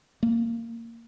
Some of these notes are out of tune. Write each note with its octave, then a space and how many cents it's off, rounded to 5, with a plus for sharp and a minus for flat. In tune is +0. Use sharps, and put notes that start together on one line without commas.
A#3 -20